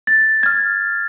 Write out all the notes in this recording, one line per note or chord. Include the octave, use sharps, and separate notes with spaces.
A6
F6 G#6